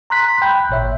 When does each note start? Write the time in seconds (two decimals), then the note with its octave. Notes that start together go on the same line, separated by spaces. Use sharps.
0.10 A#5 C6 F#6 B6
0.42 G5 B5 F#6 G6
0.69 G#1 A#2 C#5 E5